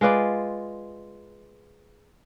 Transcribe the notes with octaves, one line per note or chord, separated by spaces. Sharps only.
G#3 F4 B4 D5